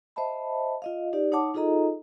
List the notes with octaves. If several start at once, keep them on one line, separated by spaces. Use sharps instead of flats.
C5 D#5 E5 A5 B5
F4 D#5 F5
D#4 G4 D5
D#4 C#5 F#5 A5 D6
D#4 F4 G#4 A4 D#5 A#5